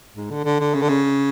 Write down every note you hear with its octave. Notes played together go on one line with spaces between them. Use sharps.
G#2
D3
D3
D3
C#3
D3
C#3